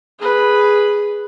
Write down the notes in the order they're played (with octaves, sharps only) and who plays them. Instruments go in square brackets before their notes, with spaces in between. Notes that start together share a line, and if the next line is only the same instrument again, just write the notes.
[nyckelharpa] G#4 B4